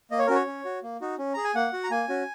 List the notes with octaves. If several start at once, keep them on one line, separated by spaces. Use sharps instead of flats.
A#3 D#5
C#5
C#4 F#4 A#4
C#5
C#4
F#4
A#3
D#4 F#4
C#4
G#4 A#5
G#5
A#3 F#5
F#4
A#5
A#3 G#5
C#4 F#4